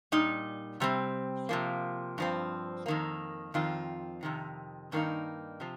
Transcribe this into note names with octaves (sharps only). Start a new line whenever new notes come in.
A#2 G3 D#4
C3 G3 C4
C3 F3 A#3
G2 F3 C4
F2 D#3 A#3
F2 D#3 C4 F4
F2 C3 D#3
G2 D#3 A#3 D#4
C3 F3